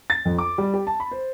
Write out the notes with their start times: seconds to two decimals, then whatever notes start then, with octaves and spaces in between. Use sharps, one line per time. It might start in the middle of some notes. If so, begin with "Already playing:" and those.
0.10 A6
0.25 F2
0.38 D6
0.58 G3
0.74 G4
0.87 A5
1.00 B5
1.11 C5